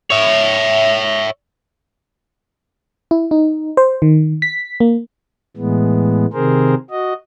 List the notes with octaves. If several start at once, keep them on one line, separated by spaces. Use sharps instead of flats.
C#5 E5
E4
D#4
C5
D#3
B6
A#3
A2 E3 G#3 B3
C3 D#3 C4 G#4 A#4 C5
F#4 D#5